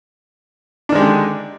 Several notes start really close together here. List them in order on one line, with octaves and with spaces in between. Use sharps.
D4 D#3 G#3 G4 D3